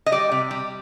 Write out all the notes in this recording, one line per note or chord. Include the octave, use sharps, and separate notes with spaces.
D#5
G3 D5
C3
G3